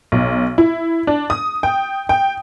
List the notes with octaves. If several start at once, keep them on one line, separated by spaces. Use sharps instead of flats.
B1
E4
D4
D#6
G5
G5